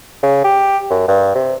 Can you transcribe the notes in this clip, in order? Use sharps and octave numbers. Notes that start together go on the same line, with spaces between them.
C#3
G4
F#2
G2
C3